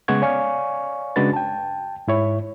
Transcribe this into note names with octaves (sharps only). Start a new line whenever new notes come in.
C#3 G#3 B3 F#5 C#6 G#6
C#5 D5 F5 G#5 C#6
C#3 G#3 D4 F#4 B4 A6
G5 A5
G#2 E4 C#5